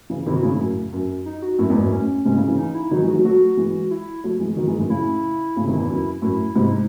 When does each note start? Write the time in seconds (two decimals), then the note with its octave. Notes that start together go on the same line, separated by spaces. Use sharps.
0.10 C#3 E3
0.26 C3 D#3 E4
0.36 F#4
0.43 A2 C#3 E4
0.59 F#2 A2
0.93 F#2
1.26 D#4
1.42 F#4
1.59 F#2 A2 E4
1.69 E2 G#2
1.81 F#2 A2
1.92 C#4
2.25 G#2 C3 C#4
2.36 A2 C#3
2.47 C#3 E3
2.58 D#4
2.75 E4
2.91 D#3 F#3 D#4
3.02 E3 G#3
3.08 F#4
3.13 F#3 A3
3.24 F#3 A3 F#4
3.57 E3 G#3
3.91 E4
4.24 F#3 A3
4.40 E3 G#3
4.57 D#3 F#3
4.67 E3 G#3
4.78 F#2 A2
4.90 A2 C#3 E4
5.56 A2 C#3
5.67 C3 D#3
5.78 E2
5.89 F#2
6.22 F#2 A2 E4
6.55 G#2 C3 E4
6.72 D#4